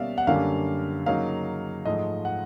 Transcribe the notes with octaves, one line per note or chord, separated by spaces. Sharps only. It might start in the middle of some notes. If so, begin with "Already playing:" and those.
Already playing: B2 G3 A#3 C#4 D5 E5 F5
F#5
F#2 D3 G3 A#3 D4 F5
C#3 F#3 A#3 D#4 F5
G#2 F3 A3 D#5
F#5